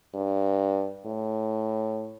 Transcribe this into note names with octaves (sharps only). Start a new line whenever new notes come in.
G2
A2